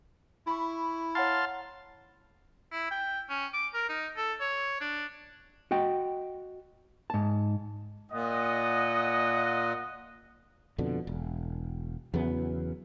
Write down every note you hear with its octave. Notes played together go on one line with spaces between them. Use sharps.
E4 B5 C#6
C#5 F5 F#5 A5 A#5 C6
E4
G5
C#4
D6
A#4
D#4
A4
C#5
D4
F#4 D#5 G5
G#2 A5
A#2 D#5 F#5
F2 B2 D3
E1
E2 C#3 F#3 B3